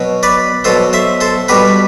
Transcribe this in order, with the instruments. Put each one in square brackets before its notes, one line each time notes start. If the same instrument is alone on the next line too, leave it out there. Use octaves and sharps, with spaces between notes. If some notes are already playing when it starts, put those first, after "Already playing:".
Already playing: [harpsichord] B2 F#3
B4 D5
B2 F#3 A4 C5
C5 E5
A4 C5
B2 G3 G4 B4